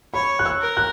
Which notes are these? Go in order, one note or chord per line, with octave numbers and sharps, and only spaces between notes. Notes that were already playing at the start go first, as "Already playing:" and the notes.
C#5 B5
F#6
E6
A#4
F#6